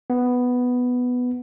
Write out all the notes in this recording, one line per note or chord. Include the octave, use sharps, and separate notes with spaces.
B3